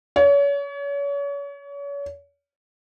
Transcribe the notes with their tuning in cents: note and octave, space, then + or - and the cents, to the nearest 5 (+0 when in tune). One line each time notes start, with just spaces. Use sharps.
C#5 +35